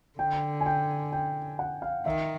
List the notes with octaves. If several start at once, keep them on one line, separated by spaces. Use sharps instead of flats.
D3 G5
G#5
G5
G5
F#5
F5
D#3 E5